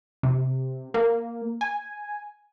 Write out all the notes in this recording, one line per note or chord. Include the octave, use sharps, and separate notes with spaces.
C3
A#3
G#5